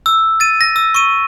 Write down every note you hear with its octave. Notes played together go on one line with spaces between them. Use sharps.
E6
A6 D#7
A#6
E6
C#6 D#7